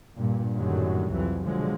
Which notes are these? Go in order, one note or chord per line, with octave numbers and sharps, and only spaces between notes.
G2 A#2
F#2 A2 D3 D#3 F#3 G3
C2 F2 C3 E3 F#3
B2 D3 F3 F#3 G#3